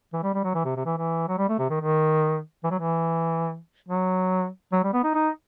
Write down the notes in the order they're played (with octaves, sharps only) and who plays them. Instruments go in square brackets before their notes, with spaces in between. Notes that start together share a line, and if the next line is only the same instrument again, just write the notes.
[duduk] E3
G3
G3
F#3
E3
C3
C3
E3
E3
F#3
G3
A3
C3
D#3
D#3
E3
F#3
E3
F#3
F#3
G3
B3
D#4
D#4